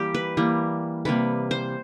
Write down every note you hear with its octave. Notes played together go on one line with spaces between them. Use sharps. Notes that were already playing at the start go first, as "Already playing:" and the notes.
Already playing: E3 G3 A#3 G4
B4
E3 G3 A#3
C3 E3 G3 A#3 B4
C5